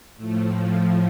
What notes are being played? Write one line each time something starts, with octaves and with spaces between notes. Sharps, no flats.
A2 F3 A3